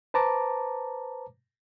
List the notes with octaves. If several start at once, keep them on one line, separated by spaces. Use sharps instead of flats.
B4 C5 A5 A#5 D6